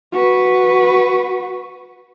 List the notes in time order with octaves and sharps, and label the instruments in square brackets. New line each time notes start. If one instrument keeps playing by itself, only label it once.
[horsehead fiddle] F#4 B4